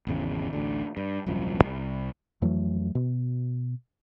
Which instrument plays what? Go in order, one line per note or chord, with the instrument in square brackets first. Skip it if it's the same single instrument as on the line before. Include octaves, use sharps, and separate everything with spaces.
[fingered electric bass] G#1 E2 C#3
A1 D2 D3
G2
D#1 C2 F#2 F3
C2
F2 E3 F#3 A3
B2